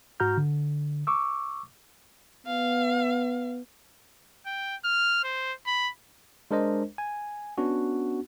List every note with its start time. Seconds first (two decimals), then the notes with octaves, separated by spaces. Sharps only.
0.20 G#2 F#4 A#5 F6 G6
0.37 D3
1.07 C#6 D6 E6
2.47 B3 F5
4.46 G5
4.84 F6
5.24 C5
5.66 B5
6.51 G#3 D4 A#4 C5 D#5
6.98 G#5
7.58 B3 C#4 D4 F#4